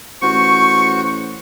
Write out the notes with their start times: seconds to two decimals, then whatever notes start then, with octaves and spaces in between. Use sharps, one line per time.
0.22 A1 F#4 C5 C#6